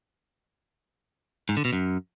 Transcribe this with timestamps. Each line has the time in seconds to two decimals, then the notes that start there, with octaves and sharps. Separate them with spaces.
1.49 G#2
1.57 D3
1.65 B2
1.73 F#2